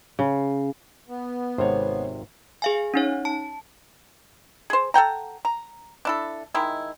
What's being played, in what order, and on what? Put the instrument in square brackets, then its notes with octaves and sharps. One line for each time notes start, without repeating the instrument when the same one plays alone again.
[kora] C#3
[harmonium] B3
[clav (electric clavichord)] G#1 C3 [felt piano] C5 C#5
[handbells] G#4 F5 G#5
C#4 D#4 C#5
A5
[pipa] G#4 C5
A4 F#5 G5 A#5
A#5
D4 E4 A4
D#3 G#3 E4